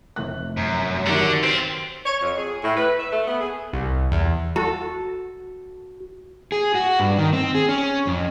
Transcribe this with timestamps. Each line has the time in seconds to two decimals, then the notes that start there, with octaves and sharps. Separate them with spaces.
0.16 F1 A3 F#6
0.57 F#2
1.07 D3 D#3 F#4 G4
1.43 C4 F4 C5
2.05 C#5
2.22 F2
2.36 G#4
2.64 A2
2.77 B4
2.99 E5
3.11 A3
3.27 B3
3.41 G#4
3.73 C2
4.12 E2
4.56 F#4 A4
6.52 G#4
6.75 F#4
6.99 G2
7.18 D#3
7.33 C4
7.55 G#4
7.69 C#4
8.07 F2